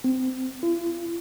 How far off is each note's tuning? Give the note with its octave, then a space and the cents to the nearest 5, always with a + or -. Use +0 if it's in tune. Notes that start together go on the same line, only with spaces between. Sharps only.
C4 -20
F4 -45